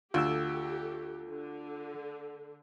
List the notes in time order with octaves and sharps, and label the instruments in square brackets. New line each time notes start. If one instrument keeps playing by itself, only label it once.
[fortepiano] D2 [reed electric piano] F4 E6 [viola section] G4 A4
[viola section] D3